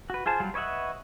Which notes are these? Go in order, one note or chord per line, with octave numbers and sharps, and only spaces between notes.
F#4 B4
F4 G#4 C5 A5
F#3 G3 F5
B4 C#5 D#5 E5 F#5